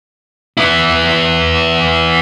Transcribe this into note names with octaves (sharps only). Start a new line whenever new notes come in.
B3 E4